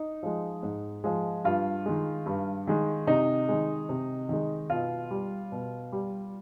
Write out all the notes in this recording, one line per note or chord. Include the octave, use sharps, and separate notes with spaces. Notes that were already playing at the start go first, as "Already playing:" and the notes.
Already playing: D#4
F3 G#3
G#2
F3 G#3
G2 F4
D#3 G#3
G2
D#3 G#3
C3 D#4
D#3 G#3
C3
D#3 G#3
B2 F4
G3
B2
G3